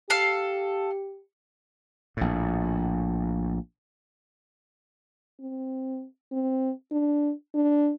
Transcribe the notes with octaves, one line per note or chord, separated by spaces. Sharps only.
G4 A4 F5 F6
A#1 A2
C4
C4
D4
D4